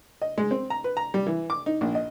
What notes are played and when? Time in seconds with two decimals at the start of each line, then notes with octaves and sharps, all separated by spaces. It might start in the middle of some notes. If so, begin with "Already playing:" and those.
0.22 D#5
0.38 G#3
0.51 C4
0.70 A#5
0.84 B4
0.97 A#5
1.14 G3
1.27 E3
1.50 D6
1.66 D#4
1.81 A#1
1.95 D#5